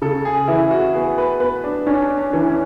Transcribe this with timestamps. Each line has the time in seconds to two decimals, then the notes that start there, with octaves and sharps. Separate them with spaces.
0.02 C#3 A4
0.25 G#4
0.48 E3 E4
0.71 F#4
0.94 B3 G#4
1.18 B4
1.40 B3 B4
1.64 D4
1.87 C#4 D4
2.18 C#4
2.33 E3
2.50 C#4